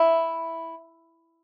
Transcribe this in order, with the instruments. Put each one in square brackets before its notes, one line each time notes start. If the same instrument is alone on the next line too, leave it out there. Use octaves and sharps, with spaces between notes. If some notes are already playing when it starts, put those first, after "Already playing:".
Already playing: [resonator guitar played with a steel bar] E4